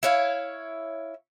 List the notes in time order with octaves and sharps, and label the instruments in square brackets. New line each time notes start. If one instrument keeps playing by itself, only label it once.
[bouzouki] E4 C#5 F5